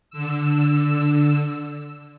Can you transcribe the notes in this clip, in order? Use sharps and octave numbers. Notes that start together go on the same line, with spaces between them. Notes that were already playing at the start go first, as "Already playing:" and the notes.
D3 E6